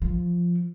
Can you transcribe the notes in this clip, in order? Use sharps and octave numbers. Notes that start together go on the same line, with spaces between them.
F3